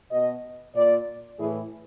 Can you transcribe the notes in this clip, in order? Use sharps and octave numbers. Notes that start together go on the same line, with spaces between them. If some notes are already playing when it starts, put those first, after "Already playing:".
B2 D#5
A#2 D5
A2 E3 G#4